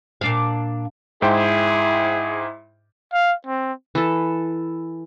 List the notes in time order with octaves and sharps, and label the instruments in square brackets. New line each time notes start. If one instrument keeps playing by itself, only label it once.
[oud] A#2 D4 F5
[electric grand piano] G#2 C5 G5 [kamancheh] E4 [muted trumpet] G#4
[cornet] F5
C4
[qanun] E3 A4